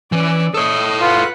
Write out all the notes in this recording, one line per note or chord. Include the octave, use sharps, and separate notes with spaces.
E3 C#4 D5
A4 C#5 D#5
F4 B4 F#5